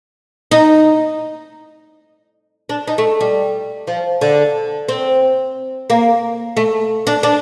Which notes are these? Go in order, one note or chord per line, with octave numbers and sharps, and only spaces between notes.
D#4
D4
D#4
A3
G3
F3
D3
C4
A#3
A3
D4
D4